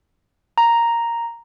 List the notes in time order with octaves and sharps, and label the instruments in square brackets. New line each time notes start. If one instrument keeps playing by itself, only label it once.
[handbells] A#5